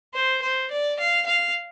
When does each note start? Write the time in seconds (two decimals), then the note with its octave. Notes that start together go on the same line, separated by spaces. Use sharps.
0.14 C5
0.42 C5
0.71 D5
0.99 F5
1.26 F5